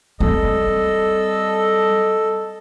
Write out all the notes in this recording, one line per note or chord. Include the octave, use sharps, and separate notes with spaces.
G3 C4 A4 D#5